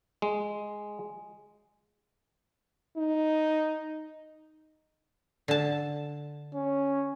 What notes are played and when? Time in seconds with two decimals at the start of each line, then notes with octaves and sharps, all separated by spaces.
0.22 G#3
2.97 D#4
5.48 D3 A5
6.55 C#4